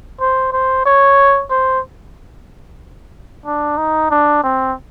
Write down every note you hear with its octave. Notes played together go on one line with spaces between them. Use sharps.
C5
C5
C#5
C5
D4
D#4
D4
C4